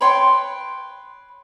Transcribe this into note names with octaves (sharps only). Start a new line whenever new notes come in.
B4 C#5 G5 C6